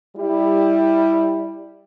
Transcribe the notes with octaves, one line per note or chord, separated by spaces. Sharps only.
G3 E4